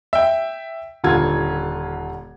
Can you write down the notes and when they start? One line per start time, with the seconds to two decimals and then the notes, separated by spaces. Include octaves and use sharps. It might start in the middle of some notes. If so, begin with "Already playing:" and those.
0.13 E5 G5
1.04 D#1 D3 F4 G#6